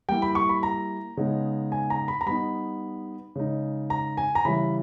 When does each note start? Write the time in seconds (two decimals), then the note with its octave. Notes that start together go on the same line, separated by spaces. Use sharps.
0.09 G3 A#3 E4 G5
0.22 B5
0.35 C#6
0.49 B5
0.63 A#5
1.17 C#3 G#3 B3 D#4
1.72 G#5
1.90 A#5
2.08 B5
2.21 A#5
2.26 G3 B3 D#4 B5
3.36 C#3 G#3 D#4
3.90 A#5
4.17 G#5
4.35 A#5
4.45 C#3 E3 G3 B5